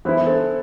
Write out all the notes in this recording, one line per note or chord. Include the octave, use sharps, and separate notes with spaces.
E3 B3 E4 C5
A4 C5